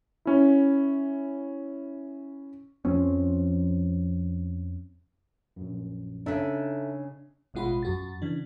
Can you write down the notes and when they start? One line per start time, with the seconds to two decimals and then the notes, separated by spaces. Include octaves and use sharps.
0.25 C#4 E4
2.85 F2 F3 C4 C#4
5.56 A#1 F#2
6.26 C#3 D4 D#4 A4 E5
7.54 A1 B2 G#3 F4 F#5 B5
7.83 F#2 F#4 A6
8.22 C#3 E3 D4